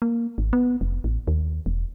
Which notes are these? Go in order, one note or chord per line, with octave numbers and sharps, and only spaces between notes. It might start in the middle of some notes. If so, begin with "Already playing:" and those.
A#3
G#1
B3
F1
A1
D#2
E1